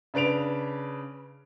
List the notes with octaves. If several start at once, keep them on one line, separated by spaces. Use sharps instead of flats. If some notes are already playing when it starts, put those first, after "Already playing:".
C#3 D4 B4 D7 F7